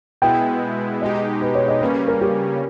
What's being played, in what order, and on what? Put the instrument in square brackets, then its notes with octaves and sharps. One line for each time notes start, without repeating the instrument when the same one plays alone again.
[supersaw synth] B2 G#3 B3 E4 [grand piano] G5
[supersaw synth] B2 G#3 D#4 G4 [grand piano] D#5
[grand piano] B4
C#5
D#5
[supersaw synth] C#3 G3 A#3 C#4 [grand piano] B4
[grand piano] A#4
G4